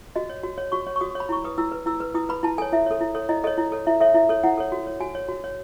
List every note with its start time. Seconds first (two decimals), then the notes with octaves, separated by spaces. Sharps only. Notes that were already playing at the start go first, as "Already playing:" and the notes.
0.16 F#4 D#5
0.30 C#5
0.44 F#4
0.58 C#5
0.72 F#4 C#6
0.87 C#5
0.96 C#6
1.01 F#4 D#6
1.15 C#5
1.20 B5
1.29 E4 C#6
1.44 B4 D#6
1.58 E4 E6
1.72 B4
1.86 E4 E6
2.00 B4
2.15 E4 D#6
2.29 B4 B5
2.43 E4 A5
2.58 A4 G#5
2.62 C#5
2.73 E4 E5
2.86 A4 C#5
3.01 E4
3.15 A4 C#5
3.29 E4 D#5
3.44 A4 C#5 D#5
3.58 E4
3.72 A4 C#5
3.87 E4 E5
4.00 A4 C#5 E5
4.14 E4 E5
4.29 A4 C#5
4.43 E4 F#5
4.58 A4 C#5
4.72 F#4
4.87 C#5
5.00 F#4 G#5
5.15 C#5
5.28 F#4
5.44 C#5